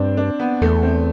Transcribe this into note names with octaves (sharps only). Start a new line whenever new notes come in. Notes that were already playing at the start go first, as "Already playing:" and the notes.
Already playing: G2 C4 D4
D4
B3
E2 A3
C4